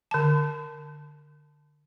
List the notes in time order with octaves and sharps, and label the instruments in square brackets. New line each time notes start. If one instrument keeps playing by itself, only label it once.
[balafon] D3 A5